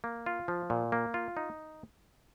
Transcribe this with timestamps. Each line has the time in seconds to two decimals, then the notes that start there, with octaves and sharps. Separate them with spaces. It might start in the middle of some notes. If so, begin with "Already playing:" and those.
0.04 A#3
0.26 F4
0.48 F3
0.70 A#2
0.92 A#3
1.14 F4
1.37 D#4